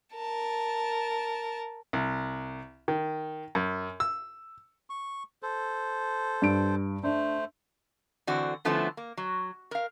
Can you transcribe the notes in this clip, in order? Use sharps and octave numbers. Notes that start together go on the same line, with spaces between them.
A#4 A5
C2
D#3
F#2
E6
C#6
A4 C5
G2 D7
A3 D4 C5
D3 E3 C4 F#4 D5
D3 F3 A3 B3 C#4 E4
A#3
F#3
A#4 F5